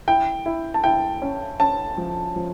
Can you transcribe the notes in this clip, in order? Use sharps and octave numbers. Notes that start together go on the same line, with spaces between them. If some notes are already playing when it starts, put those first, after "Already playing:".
E4 G5
E4
A5
E4 G5
C#4
C#4 A5
F3
F3